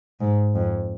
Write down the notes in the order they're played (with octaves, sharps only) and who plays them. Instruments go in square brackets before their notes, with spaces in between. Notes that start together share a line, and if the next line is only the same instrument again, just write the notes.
[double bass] G#2
F2